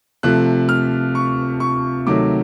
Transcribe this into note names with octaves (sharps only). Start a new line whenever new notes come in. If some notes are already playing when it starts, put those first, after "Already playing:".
C3 F3 A3 F#6
F6
C#6
C#6
C3 D#3 F#3 A3 D6